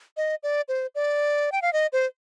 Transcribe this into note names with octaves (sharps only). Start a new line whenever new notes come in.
D#5
D5
C5
D5
G5
F5
D#5
C5